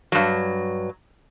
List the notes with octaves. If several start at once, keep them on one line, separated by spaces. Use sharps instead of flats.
G2 F#3